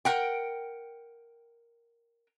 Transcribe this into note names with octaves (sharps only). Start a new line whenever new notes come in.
A#4 F#5 G5